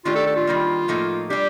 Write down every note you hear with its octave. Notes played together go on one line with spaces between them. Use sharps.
D#3 A3 D4 F4 G4
A4
A4
F4
D#3 G3 A#3
A2 F3 A#3 D#4 A4
G3 D4 G4